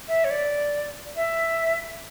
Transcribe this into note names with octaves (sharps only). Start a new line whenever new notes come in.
E5
C#5
D5
E5